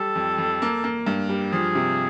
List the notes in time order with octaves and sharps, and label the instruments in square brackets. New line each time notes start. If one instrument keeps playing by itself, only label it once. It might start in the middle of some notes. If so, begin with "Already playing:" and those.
Already playing: [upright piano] G3 [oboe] A4
[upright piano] F2
F2
A#3
A#3
G2
G3
[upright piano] F3 [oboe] G#4
[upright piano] C3